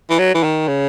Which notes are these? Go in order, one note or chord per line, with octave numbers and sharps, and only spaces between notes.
E3
F#3
E3
D#3
C#3